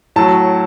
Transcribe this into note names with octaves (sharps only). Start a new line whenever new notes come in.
A2 F#3 A5